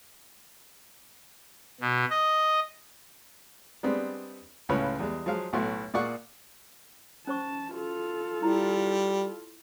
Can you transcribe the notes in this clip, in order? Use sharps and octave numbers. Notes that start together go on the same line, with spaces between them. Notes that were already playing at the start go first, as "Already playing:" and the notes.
B2
D#5
G3 G#3 B3 C4 D4
C#2 A2 C#3 F4 B4 C#5
E2 G3 G#3
F3 F#3 G#3 F5
B1 A2 A3 F#4 C6
A#2 A#3 G#4 D5 F#5 C#6
C#4 C5 A5 C#6
F4 F#4 A4
G3 E4